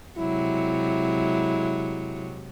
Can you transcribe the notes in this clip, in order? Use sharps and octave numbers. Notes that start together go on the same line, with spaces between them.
C3 F#3 G#3 E4